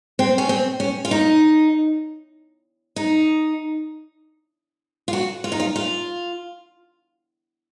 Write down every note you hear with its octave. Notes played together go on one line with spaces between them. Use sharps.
C4
C#4
C4
C#4
F4
D#4
D#4
F4
F#4
F4
D#4
F4
F4